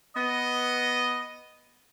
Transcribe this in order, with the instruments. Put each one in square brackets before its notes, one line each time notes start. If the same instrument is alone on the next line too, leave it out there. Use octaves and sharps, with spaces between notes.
[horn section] B3 D#5